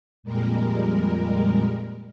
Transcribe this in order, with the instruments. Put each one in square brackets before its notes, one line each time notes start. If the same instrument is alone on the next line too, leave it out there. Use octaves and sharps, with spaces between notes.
[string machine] F2 A#2 G3 G#3 A#4